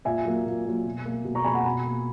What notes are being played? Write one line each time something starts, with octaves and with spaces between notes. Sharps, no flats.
A#2 E5 G#5
F#3 A#3
A#2
F#3 A#3
B2
A#3
B2
A#5 C#6
A#3 G#5 B5
F#5 A#5
B2 G#5 B5
A#3